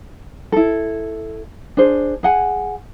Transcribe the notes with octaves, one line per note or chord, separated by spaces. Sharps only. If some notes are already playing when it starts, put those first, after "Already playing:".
E4 A4
D4 G#4 C5
G#4 F#5 G#5